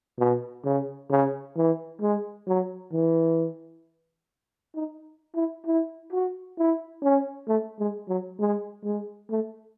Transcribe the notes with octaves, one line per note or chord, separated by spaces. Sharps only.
B2
C#3
C#3
E3
G#3
F#3
E3
D#4
E4
E4
F#4
E4
C#4
A3
G#3
F#3
G#3
G#3
A3